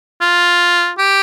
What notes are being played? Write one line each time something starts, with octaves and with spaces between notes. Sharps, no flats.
F4
G4